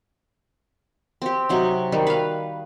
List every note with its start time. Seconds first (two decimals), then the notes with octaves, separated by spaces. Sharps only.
1.22 C4 G4
1.49 C3 F#3 D#4
1.92 D#3 G3
2.07 B4 F5